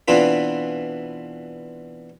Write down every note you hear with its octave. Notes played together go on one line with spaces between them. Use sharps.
B2 E3 C4 D4 F4 B4